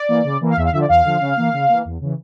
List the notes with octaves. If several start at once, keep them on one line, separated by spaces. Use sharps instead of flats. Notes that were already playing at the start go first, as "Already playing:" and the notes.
Already playing: D5
E3 A#3
C#3
E3 A#3
F5
E2 E5
F5
D3 F3 E5
D5
E2 F5
D3 F3
C#3
E3 A#3
C#3
E3 A#3
E2
C#3 E3